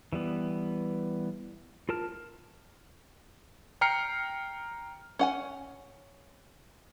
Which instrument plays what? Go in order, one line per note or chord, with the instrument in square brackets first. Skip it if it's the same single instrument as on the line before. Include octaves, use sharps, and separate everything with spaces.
[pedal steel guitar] E3 G3 B3
F4 A#4 A5 F6
[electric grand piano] G5 A#5 F6 C7 C#7
[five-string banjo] C#4 F#5 G#5